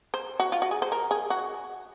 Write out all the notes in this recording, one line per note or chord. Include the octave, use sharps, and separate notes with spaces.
C5
F#4
F4
F#4
G#4
C5
A#4
G#4
F#4